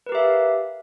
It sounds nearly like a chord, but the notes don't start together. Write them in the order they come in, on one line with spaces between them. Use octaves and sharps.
B4 A#4 G4 E5 F5